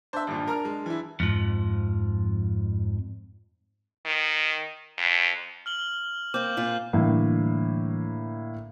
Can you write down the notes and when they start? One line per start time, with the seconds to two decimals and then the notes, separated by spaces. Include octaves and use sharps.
0.13 D4 C5 E5
0.27 G#1 G2 A#2
0.47 A#4 A#5 F6
0.65 G#3
0.86 E3 E4
1.20 F2 G#2 F3
4.06 D#3
4.97 F2
5.66 F6 F#7 G7
6.34 A#3 C4 D6 G6
6.57 A#2 F4
6.93 A2 D3 E3 G3 A#3